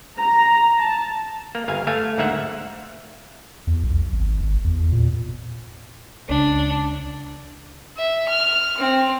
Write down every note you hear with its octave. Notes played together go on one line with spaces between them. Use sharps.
A#5
A5
A#3
G1 F5 G#5
A3 F5 G#5
D2 G#2 A#3 E5 F#5
E2
B1
G#1
G#1
E2
A#2
C#2 D4
E5
F6
C4